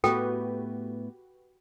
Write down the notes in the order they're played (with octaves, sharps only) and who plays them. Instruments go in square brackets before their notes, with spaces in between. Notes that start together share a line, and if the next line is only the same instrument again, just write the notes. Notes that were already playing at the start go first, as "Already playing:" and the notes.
[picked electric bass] A2 A3 B3 [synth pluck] F#4 G4 B4 [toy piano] A4 G5